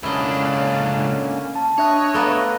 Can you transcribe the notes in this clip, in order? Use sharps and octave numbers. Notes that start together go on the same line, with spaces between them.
C#2 D3 A#3 C#4 D4 E4 D#5
A5
D4 C#5 D#5 E5 F#6
A3 B3 D4 F5 A#5 F#6